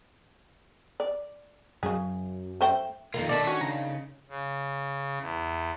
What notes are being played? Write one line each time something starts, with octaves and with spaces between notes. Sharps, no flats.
D5
F#2 C#3 G#4
A3 C5 G5
F2 D#3 A#3 F4
D#3 F#3 D4 D5 E5
C#4 F#4
C#3 A#5
C#3
E2